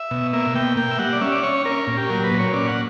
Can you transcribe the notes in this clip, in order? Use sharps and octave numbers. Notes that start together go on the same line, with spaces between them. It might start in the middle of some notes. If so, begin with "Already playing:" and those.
Already playing: E5
B2
A#3 E5
B2 G5
A#3 G5
E5
G3 F#5
D5
C#4 E5
D5
C#4 C#5
C#4 A#4
A#2
G4
F#3 A#4
B4
A#2
C#5
C#4 D5
F#5